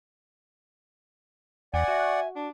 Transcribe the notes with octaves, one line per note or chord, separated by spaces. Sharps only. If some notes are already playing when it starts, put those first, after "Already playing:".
E2 D5 F#5 G#5
F#4 E5
D4